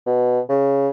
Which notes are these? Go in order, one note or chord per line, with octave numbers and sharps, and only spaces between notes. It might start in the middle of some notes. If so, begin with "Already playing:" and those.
B2
C#3